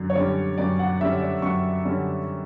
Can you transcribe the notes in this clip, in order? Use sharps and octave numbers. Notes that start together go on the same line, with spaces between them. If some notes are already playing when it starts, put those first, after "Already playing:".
Already playing: F#2 D3
C#5
D3 G3 C#4 D5
F#2 D5
F#5
D3 G3 C#4 E5
D5
F#2 C#6
D3 G3 C#4